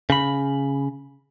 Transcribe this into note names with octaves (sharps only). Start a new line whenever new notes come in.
C#3 B5